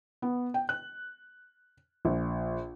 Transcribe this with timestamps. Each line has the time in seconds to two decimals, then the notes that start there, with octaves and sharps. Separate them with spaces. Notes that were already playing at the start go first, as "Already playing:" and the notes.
0.22 B3
0.54 G5
0.69 F#6
2.05 A#1